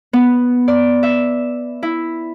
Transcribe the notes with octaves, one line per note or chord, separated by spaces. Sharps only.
B3
D5
E5
E4